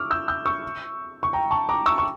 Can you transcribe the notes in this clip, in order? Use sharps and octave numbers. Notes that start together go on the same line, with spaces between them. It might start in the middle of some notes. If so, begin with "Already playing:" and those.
Already playing: C#6 D6 E6 F6
E6 G6
E6 G6
C#6 E6
C#6
G5 A#5
A5 C#6
A#5 D6
C#6 E6
C#6